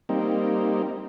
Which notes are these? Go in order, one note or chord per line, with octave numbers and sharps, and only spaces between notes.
G3 A#3 C4 D#4